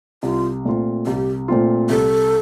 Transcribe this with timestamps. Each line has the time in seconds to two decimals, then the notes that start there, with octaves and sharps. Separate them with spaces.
0.23 C2 F4
0.65 A#2 A3 C4 F4
1.06 C2 G4
1.48 A#2 A3 C4 F4
1.89 C2 A4